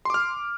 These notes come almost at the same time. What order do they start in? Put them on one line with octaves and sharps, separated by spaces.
C6 D6 F6